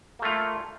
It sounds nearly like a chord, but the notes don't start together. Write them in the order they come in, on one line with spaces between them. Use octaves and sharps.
A#3 A3 F4